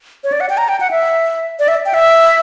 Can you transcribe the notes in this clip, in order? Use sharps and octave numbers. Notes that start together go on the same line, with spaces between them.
C#5
D5
F#5
G5
A#5
G5
F#5
E5
D5
E5
G5
E5